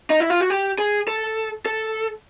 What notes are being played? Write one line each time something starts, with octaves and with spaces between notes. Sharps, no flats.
D#4
E4
F4
F#4
G4
G#4
A4
A4